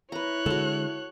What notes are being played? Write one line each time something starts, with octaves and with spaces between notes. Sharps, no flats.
E4 B4 C#5 A#5 F#6
D3 G#3 F#4 A4